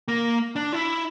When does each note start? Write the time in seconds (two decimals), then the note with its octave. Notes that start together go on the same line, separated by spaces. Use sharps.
0.08 A#3
0.56 D4
0.73 E4